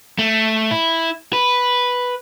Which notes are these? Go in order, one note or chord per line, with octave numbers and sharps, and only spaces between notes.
A3
E4
B4